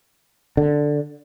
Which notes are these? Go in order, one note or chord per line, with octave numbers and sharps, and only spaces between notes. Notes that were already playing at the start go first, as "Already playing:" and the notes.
D3